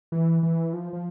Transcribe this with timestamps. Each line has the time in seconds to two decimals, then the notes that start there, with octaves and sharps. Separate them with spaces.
0.12 E3
0.43 E3
0.73 F3
0.93 F3